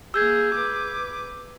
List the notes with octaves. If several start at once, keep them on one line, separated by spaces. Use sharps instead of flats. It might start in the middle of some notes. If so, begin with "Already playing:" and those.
A#3 G#4 E6 G6 G#6
B4 D6